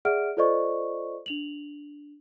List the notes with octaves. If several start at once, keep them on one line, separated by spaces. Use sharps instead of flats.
G#4 D5 E5 F#5 F6 D7
F4 A4 C5 D5 D#5 C#6
D4 F7 F#7